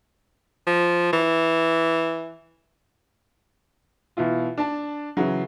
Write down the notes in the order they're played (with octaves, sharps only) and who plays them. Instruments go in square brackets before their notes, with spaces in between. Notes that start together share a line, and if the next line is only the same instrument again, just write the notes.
[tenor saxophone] F3
E3
[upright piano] B2 E3 E4 F4
D4 A5
C#3 E3 F#3